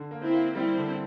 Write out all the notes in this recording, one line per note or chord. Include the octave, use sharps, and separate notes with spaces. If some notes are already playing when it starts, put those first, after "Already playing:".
Already playing: D3
A#3
C4 E4
A#3
G3 C4 E4
D3